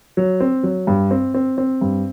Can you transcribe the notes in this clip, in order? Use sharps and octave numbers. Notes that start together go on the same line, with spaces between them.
F#3
C4
F#3
G2
C4
C4
C4
G2